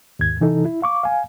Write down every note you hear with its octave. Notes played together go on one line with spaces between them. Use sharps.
D#2 G#2 G#6
C3 E3 D#4 A4
E4
F5 C#6 D6
F5 G#5